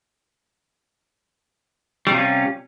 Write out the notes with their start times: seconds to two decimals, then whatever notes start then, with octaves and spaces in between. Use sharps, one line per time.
2.07 G3
2.10 C3
2.14 F4
2.18 C#4